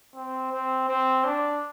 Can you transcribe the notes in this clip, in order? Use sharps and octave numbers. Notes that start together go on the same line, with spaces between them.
C4
C4
C4
D4